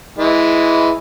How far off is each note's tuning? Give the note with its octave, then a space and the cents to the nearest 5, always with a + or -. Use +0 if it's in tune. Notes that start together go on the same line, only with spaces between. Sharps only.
E3 +0 G#3 +0